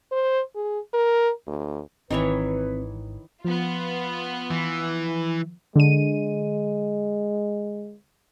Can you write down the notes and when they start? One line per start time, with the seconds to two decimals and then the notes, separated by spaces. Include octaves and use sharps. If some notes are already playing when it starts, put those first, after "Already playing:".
0.11 C5
0.56 G#4
0.93 A#4
1.47 D2
2.11 G#1 D#3 E3 C4 B4 C#5
3.45 F3 B3 F4
4.51 E3
5.76 D3 G#3 D#7